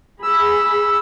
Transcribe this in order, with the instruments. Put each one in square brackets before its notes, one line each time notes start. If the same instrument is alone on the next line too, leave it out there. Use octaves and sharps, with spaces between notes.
[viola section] G#4 B5 [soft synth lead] E6